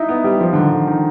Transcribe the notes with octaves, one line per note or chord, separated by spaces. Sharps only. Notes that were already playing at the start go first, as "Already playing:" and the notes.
Already playing: D#4 E4
B3
G3
F3
D3
D#3
D3
D#3